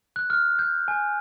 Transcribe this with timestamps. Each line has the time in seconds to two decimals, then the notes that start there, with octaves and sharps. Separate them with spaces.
0.16 F#6
0.30 F6
0.59 G6
0.88 G#5